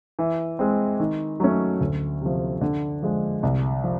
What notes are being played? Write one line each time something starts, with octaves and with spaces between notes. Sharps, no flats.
E3
G#3 C4
D#3
F#3 A3 C#4
D2
C3 F3
D3
F3 G#3
C2
F3